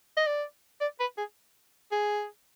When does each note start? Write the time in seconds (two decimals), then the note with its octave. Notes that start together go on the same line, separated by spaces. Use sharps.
0.17 D#5
0.26 D5
0.81 D5
1.00 B4
1.18 G#4
1.92 G#4